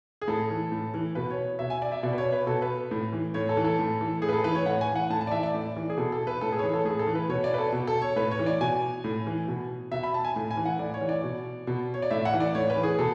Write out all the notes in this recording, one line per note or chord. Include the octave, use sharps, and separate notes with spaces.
G#4
A2 A4
E3
A2
E3
B2 B4
C#5
B2 E5
G#5
D5
E5
B2 D5
B4
C#5
B4
B2 A4
B4
A2
E3
A2 C#5
A4
E3
A4
A2
E3
A2 G#4
B4
A4
E3 B4
C#5
A2 F#5
G#5
E3
F#5
A2 A5
A5
D5
E3 E5
D5
A2
E3
G#4
B2 A4
A4
B4
A2 A4
G#4
C#5
E3 B4
A4
A2 G#4
A4
E3
B4
B2 C#5
D5
B4
A4
B2
A4
C#5
A2 B4
C#5
E3
D5
B2 G#5
A2
E3
B2
B2 E5
B5
A5
G#5
A2
G#5
E3
F#5
A2 D5
C#5
E3
D5
B2
B2
C#5
D5
A2 E5
F#5
E3
D5
A2 C#5
B4
E3
G#4
B2 A4